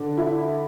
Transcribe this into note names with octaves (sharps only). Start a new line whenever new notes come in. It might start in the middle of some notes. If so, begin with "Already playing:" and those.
Already playing: D3 D4
E4